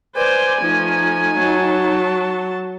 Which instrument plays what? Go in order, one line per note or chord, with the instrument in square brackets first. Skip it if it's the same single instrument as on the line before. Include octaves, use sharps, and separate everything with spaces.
[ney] B4 [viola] C5 D5 [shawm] G#5
[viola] F3 A3 [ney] D#4
[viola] F#3 A5